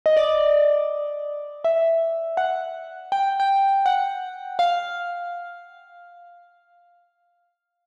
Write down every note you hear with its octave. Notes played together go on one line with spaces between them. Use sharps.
D#5
D5
E5
F#5
G5
G5
F#5
F5